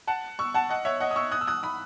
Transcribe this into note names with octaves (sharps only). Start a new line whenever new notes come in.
F#5 A5
C#6 E6
F#5 A5
D#5 F#5
C#5 E5
D#5 F#5
D#6
C#6 E6
D#6 F#6
E6
D#6 F#6
B5 D#6